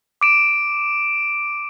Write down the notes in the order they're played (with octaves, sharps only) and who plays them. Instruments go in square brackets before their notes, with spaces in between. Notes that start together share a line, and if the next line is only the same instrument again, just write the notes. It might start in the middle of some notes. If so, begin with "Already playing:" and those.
[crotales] D6 D7 E7